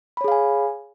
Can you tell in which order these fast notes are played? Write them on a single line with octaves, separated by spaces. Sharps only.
B5 C#5 G#4 F5 G#5